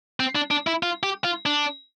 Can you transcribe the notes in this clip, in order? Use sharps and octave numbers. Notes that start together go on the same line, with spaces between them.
C4
D4
D4
E4
F4
G4
F4
D4